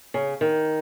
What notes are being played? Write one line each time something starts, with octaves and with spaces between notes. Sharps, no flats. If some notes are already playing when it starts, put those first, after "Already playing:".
C#3
D#3